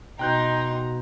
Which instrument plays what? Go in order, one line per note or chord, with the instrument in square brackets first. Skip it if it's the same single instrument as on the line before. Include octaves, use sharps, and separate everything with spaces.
[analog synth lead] B2 [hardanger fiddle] D#4 C6 [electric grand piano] G5 F#6 G6 [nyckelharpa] A#5